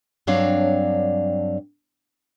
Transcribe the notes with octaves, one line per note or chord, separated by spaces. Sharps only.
G2 F#3 C4 D4 C#5 F5